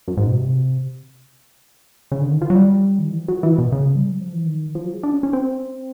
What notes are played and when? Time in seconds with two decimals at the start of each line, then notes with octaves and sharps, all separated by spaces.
0.08 F#2
0.17 G#2
0.27 B2
0.37 C3
2.12 C#3
2.21 D3
2.31 D#3
2.41 F3
2.50 F#3
2.56 G3
2.99 D#3
3.09 E3
3.18 F3
3.28 F#3
3.38 F3
3.43 E3
3.58 B2
3.72 C#3
3.96 G3
4.08 F#3
4.20 F3
4.33 E3
4.46 D#3
4.75 F3
4.85 F#3
4.94 G#3
5.03 D4
5.13 C#4
5.23 C#4
5.33 C4